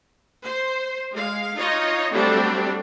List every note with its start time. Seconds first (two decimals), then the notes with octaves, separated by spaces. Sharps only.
0.46 C5
1.11 G#3 F5
1.57 D#4 F4 C#5 D#5
2.12 F#3 G3 A3 C4 D4 G4